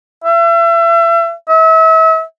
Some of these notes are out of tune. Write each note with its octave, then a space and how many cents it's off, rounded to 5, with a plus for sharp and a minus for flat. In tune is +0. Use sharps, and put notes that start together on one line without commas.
E5 +35
E5 -35